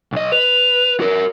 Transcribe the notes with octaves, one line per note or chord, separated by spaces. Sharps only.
B1 D#5
B4 F7
F#4 A#4